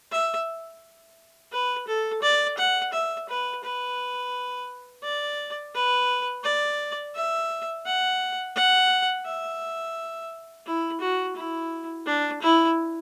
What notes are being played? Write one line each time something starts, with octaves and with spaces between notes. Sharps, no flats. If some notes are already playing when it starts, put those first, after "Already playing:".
E5
B4
A4
D5
F#5
E5
B4
B4
D5
B4
D5
E5
F#5
F#5
E5
E4
F#4
E4
D4
E4